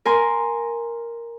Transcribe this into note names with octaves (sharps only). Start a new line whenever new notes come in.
A#4 G#5 C6